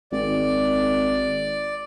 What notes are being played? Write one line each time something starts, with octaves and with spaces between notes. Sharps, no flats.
G#1 D5